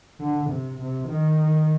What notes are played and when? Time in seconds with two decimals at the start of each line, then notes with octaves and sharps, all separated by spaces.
0.20 D3
0.50 C3
0.80 C3
1.09 D#3